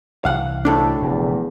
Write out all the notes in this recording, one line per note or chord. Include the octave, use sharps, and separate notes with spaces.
C2 E3 F5 F#5
D2 A2 A3 D4
F1 E2 A#2